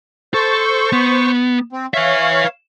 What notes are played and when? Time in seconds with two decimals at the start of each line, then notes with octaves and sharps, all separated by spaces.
0.34 A4 C5 C#6
0.93 B3
1.72 C4
1.94 B4 C#5 E5 F5